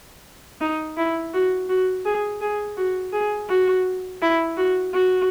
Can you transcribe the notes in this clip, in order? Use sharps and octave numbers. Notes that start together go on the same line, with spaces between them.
D#4
E4
F#4
F#4
G#4
G#4
F#4
G#4
F#4
E4
F#4
F#4